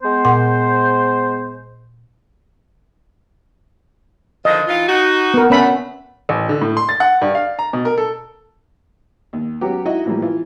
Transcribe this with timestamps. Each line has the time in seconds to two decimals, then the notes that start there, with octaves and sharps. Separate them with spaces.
0.03 G#3 B3 C5
0.25 A#2 F#5 C6
4.45 D3 D#3 F3 D#5
4.67 E3 D#4 F4
4.87 D#4 F#4
5.34 B3 A#4
5.50 D3 A3 B3 C#4 B5
6.29 A1
6.49 D3
6.61 A2
6.77 C6
6.89 A6
7.00 F#5
7.22 G2
7.35 F5
7.59 A#5
7.73 B2
7.85 A#4
7.98 A4
9.33 D#2
9.61 F#3 B3 C#4 G4
9.85 D#4 E4 F#4 D#5 E5
10.06 A2 E3 F3 G3 A#3
10.22 E3 F4